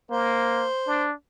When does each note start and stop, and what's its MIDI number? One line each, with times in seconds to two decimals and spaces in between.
0.11 0.67 58
0.11 1.05 72
0.88 1.14 62